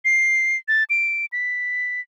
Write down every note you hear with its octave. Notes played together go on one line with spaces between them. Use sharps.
C7
A6
D7
B6